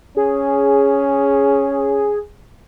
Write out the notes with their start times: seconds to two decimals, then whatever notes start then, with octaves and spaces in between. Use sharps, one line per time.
0.17 C#4 G#4